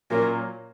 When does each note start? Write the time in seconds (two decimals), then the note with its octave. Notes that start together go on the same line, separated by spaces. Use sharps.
0.10 A#2 F#3 A#3 C#4 A#4